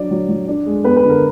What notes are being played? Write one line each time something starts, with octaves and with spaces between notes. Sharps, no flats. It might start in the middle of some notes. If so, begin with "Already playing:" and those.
Already playing: F#3 D4 D5
F#3
F#3
D4
G#3
B3 B4
B4
D3
A#4